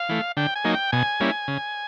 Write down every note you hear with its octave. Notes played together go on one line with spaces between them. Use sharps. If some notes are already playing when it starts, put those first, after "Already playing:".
Already playing: F5
E3 A3
D3 G5
G#5
F#3 A#3 D#4
G5
B2 G#5
G3 A#3 C#4 E4
C#3